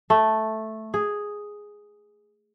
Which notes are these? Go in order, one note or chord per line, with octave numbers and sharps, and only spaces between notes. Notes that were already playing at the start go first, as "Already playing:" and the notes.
A3
G#4